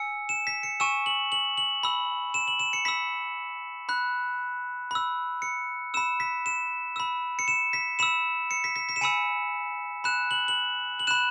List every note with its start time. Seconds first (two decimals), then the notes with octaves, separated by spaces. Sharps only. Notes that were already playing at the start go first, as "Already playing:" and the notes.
Already playing: G#5 E6 C#7
0.29 E7
0.47 B6
0.63 C#7
0.80 G#5 C#6 E6 E7
1.06 F#7
1.32 F#7
1.58 F#7
1.83 B5 E6
2.34 E7
2.48 F#7
2.60 E7
2.73 C#7
2.85 B5 E6 B6
3.89 B5 F#6
4.91 B5 E6
5.42 C#7
5.94 B5 E6 E7
6.20 B6
6.46 E7
6.96 B5 E6
7.39 C#7
7.48 E7
7.73 B6
7.99 B5 E6 E7
8.51 C#7
8.64 B6
8.76 B6
8.89 B6
8.96 E7
9.01 G#5 B5 E6 C#7
10.04 B5 F#6 E7
10.31 F#7
10.48 F#7
11.00 F#7
11.07 B5 F#6 E7